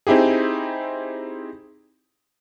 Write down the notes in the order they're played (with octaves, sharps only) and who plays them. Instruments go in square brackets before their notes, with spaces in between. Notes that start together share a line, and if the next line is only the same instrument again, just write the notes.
[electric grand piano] C4 D#4 E4 G4 G#4